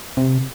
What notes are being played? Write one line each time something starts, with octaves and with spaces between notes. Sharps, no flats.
C3